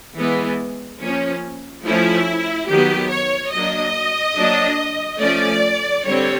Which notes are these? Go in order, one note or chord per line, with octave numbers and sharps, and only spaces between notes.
E3 G#3 B3
F3 A#3 C#4
F3 A3 C#4 E4
D#3 F#3 B3 G4
C#5
F#3 A#3 D4 D#5
F#3 A#3 D4
F3 A3 C#4 D5
D3 G3 C4 C#5